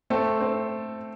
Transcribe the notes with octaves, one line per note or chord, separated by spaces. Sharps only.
A3 C4 A4
C4